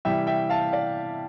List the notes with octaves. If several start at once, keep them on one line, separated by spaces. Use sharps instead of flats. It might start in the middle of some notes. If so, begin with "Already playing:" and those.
C3 E3 G3 E5 G5
E5 G5
F5 A5
D5 F5